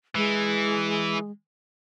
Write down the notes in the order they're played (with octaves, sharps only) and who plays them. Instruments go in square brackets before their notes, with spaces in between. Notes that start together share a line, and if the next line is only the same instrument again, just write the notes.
[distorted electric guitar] E3 [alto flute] G#3